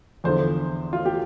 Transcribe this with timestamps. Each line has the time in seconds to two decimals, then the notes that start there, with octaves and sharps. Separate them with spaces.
0.24 E2 D3 F3 C5
0.93 F4
1.05 G4